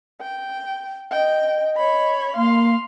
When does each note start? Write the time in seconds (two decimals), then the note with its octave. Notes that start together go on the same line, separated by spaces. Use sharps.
0.21 G5
1.12 D#5 G5
1.77 C#5 B5
2.36 A#3 F5 C6